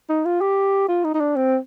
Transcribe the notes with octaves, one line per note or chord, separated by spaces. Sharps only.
D#4
F4
G4
F4
D#4
D#4
D4
C4